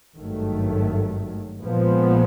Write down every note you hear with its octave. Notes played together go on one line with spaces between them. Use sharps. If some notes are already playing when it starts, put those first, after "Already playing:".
G#1 G2 D#3 F#3 A3
A#1 A#2 F3 G#3 B3